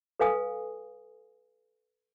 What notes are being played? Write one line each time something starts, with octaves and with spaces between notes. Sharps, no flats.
A4 B4 F5 G#5 D#6